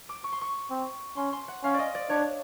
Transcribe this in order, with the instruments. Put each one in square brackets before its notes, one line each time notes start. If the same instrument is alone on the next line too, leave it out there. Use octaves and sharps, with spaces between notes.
[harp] D6
C#6
C6
C#6
[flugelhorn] C4
[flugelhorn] C#4 [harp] C6
[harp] C6
F#5
[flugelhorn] C#4 [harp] F5
[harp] D5 D#5
D5
[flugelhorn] D4 [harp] C#5